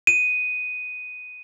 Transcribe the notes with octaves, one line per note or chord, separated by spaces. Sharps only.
D#7